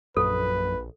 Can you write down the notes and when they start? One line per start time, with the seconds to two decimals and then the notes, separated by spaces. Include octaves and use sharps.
0.17 A#1 F#2 A4 B4